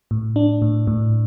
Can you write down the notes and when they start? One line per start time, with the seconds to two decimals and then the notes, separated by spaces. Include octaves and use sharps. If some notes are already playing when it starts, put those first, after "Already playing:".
0.11 A2
0.36 D4
0.62 A2
0.87 A2